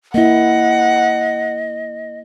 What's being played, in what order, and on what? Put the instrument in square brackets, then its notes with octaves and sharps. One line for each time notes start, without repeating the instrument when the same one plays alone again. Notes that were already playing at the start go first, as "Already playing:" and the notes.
[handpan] A#3 E4 [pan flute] D#5 [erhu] F#5